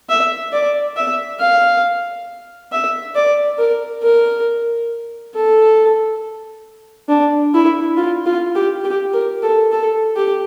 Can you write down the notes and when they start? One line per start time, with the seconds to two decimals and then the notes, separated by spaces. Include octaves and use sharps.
0.09 E5
0.52 D5
0.96 E5
1.40 F5
2.72 E5
3.15 D5
3.58 A#4
4.02 A#4
5.35 A4
7.09 D4
7.54 E4
7.97 F4
8.26 F4
8.55 G4
8.84 G4
9.13 A#4
9.42 A4
9.71 A4
10.16 G4